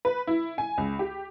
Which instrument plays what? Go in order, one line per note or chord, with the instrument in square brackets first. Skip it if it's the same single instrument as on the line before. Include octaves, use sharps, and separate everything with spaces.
[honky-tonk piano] B4
E4
G#5
C#2
G4